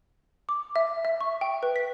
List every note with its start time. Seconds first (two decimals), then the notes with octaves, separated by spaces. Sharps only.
0.49 D6
0.76 E5
1.05 E5
1.21 C#6
1.41 G5
1.63 B4
1.76 B6